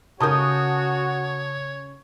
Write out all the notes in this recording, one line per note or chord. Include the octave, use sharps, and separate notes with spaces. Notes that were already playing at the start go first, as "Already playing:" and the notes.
C#3 F#4 A#4 C#5 A5 D#6 G6